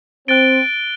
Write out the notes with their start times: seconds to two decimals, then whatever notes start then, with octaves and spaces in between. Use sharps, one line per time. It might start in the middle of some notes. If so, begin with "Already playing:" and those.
0.28 C4 F#6 A6 D7 G7